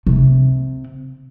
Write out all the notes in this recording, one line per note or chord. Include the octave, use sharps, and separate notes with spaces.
C3